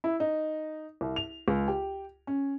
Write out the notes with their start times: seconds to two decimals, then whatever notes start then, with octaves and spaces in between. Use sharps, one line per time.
0.04 E4
0.20 D#4
1.01 C2
1.16 F7
1.48 C#2
1.68 G4
2.27 C#4